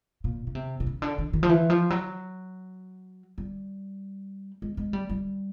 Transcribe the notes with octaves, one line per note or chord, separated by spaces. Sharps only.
A#2
C#3
C3
C3
C#3
D3
D#3
D#3
F3
E3
F3
F#3
G3
G#3
G#3
G3
G3